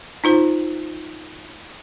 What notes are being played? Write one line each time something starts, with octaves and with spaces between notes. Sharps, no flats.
D#4 F4 C5